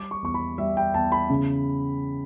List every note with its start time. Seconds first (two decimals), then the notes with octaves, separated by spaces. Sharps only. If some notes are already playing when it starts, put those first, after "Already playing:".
Already playing: G3 D6
0.11 C#6
0.22 E2 C#6
0.34 B5
0.58 G3 E5
0.77 G5
0.94 E2 A5
1.12 B5
1.30 C#3